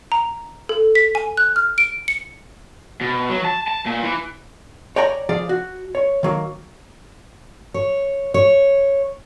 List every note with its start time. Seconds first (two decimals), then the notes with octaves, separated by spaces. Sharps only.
0.12 A#5
0.69 A4
0.95 B6
1.15 G#5
1.37 F#6
1.56 F6
1.78 D7
2.08 C#7
3.01 B2
3.29 F#3
3.44 A5
3.68 A5
3.86 A#2
4.03 E3
4.96 C#5 D5 G5 G#5 A#5
5.29 F3 G#4 D5 F5
5.49 F#4
5.95 C#5
6.23 D#3 F#3 A#3
7.74 C#5
8.34 C#5